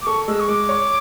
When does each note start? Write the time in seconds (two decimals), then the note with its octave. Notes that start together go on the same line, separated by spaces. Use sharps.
0.02 D6
0.06 A4 C#6
0.27 G#3 E6
0.40 C#6
0.48 G#3 D6
0.69 C#5